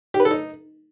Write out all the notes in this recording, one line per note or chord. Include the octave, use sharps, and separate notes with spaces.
G4
B4
A4
D#4